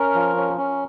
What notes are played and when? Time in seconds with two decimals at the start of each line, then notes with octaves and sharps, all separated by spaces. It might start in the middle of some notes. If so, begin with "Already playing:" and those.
Already playing: C#4 A#4
0.15 F3
0.36 C#4
0.58 C#4